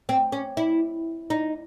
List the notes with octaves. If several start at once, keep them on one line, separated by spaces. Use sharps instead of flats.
C4
C#4
E4
D#4